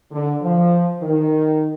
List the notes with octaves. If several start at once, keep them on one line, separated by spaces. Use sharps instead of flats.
D3
F3
D#3